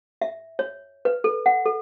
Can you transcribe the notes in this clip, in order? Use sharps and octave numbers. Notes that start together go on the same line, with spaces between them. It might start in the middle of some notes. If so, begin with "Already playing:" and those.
E5
C#5
B4
A4
F#5
A4